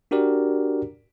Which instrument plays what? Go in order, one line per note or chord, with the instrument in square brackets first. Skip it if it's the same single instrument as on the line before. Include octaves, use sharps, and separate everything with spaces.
[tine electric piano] D4 F#4 G4 A#4 D5